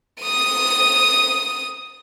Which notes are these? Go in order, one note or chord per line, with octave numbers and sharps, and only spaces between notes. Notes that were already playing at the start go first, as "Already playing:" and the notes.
D#6 D#7